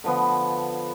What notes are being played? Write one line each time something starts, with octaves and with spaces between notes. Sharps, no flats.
D3 F3 B3